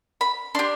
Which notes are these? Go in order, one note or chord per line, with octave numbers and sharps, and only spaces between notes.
B5
D4 G4 C6